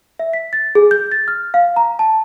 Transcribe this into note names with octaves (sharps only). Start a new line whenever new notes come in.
E5
B6
A6
G#4
G6
A6
F6
F5
A#5
A5